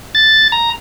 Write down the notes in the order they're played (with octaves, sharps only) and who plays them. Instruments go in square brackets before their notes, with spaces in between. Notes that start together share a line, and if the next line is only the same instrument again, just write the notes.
[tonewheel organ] A6
A#5